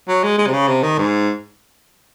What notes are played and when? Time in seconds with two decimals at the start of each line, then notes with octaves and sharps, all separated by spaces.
0.08 F#3
0.23 G#3
0.38 G#3
0.47 C3
0.53 C#3
0.68 C3
0.83 D#3
0.98 G#2